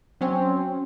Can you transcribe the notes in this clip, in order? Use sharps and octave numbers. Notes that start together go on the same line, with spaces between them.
F#3 C4 C#4